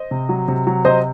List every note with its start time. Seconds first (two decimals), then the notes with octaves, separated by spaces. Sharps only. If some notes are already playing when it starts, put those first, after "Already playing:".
Already playing: C5 D#5
0.11 C3
0.29 F#3
0.48 C3
0.67 F#3
0.85 C3 C5 D#5